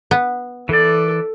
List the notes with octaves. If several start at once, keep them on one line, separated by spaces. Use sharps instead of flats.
B3
E3 A4 D5